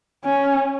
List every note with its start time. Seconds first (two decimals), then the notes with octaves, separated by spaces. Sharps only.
0.25 C#4